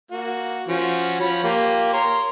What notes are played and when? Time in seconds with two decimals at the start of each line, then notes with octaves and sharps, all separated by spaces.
0.11 A#3 F#4
0.68 F3 C#4 F#4
1.20 F3 C#5 B5
1.44 A#3 F4 G4
1.93 A#4 C#5 C6